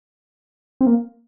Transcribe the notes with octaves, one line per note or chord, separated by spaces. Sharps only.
C4
A#3